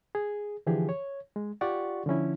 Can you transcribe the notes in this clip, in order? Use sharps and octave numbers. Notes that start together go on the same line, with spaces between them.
G#4
D3 E3 F3 G4 G#4
C#5
G#3
F4 G4 D5 F#5 C#6
D3 F3 C#4 E4